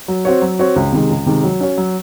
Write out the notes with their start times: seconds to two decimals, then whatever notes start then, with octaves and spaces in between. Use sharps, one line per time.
0.08 F#3
0.25 C4 F#4 C#5
0.42 F#3
0.59 C4 F#4 C#5
0.76 C#2
0.92 C3 D#3 G#3
1.10 C#2
1.26 C3 D#3 G#3
1.43 F#3
1.61 C#4 F#4 C#5
1.78 F#3